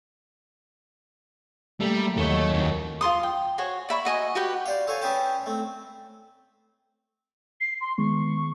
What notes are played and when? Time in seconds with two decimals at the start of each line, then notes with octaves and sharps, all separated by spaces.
1.80 G3 A3 A#3
2.17 D#2 A3 C#5
2.29 F#3
2.53 F2 D#3
3.01 F4 A4 C6 D#6
3.23 G5
3.58 F#4 C5 C#5 G#5
3.89 D5 E5 B5 C#6
4.05 F#4 D#5 G#5 C#6
4.35 F#4 G4 B4 G5
4.66 C5 D5 F5
4.87 A4 C5 C#5 F5 G#5
5.02 C#4 G#4 B4 C5 G5 A5
5.46 A3 C4
7.61 C7
7.81 C6
7.98 D#3 G#3 B3 C#6